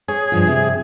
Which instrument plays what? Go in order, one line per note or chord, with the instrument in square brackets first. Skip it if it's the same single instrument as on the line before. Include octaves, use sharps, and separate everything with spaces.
[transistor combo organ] G#4 [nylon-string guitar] C#5
[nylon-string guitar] G2 F3 F4
C3